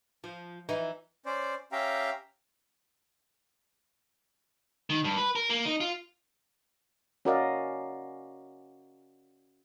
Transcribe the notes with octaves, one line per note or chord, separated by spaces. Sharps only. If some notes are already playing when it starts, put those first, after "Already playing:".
F3
E3 D#4
C#4 C5 D5
C#4 G4 E5 F5 G5 A#5
D#3
G2
B4
A#4
A#3
D#4
F4
C#4 F#4 A#4 D5 D#5 F5